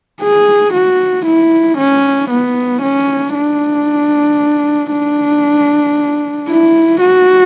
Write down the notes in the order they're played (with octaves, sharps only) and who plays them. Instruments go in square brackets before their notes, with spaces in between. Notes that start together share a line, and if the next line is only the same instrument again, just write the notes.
[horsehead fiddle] G#4
F#4
E4
C#4
B3
C#4
D4
D4
E4
F#4